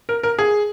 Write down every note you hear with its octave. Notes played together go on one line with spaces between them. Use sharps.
A#4
A#4
G#4